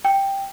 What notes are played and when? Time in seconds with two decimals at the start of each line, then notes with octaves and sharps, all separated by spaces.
0.05 G5